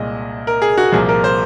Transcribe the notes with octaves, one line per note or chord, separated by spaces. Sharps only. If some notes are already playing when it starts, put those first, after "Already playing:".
Already playing: C2 A#2 G#3 D#5
A#4
G#4
F#4
C2 A#2 F3 A#3 G#4
A#4
C5